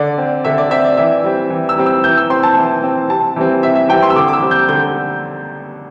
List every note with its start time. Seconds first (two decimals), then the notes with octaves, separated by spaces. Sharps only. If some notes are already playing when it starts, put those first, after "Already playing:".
Already playing: D3 D5
0.18 C4
0.45 D3 E5
0.58 D5
0.71 C4 E5
0.85 D5
0.97 E3 E5
1.24 G3 C4
1.50 E3
1.69 E6
1.77 G3 C4
1.86 E6
2.04 E3 G6
2.17 E6
2.30 C4 C6
2.43 A5
2.57 E3
2.84 C4
3.09 C3 A5
3.36 E3 G3 C4
3.63 C3 E5
3.75 E5
3.89 E3 G3 C4 G5
4.03 C6
4.10 E6
4.15 D3 D6
4.28 D6
4.33 E6
4.42 G3 C4
4.51 G6
4.68 D3 G6